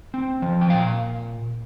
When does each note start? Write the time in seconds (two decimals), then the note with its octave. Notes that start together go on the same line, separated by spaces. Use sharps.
0.14 C4
0.42 F3
0.61 G5
0.70 A#2 F5